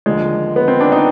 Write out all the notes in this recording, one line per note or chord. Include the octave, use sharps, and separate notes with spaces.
D#2 D3 F3 G#3
B3
C4
D4
D#4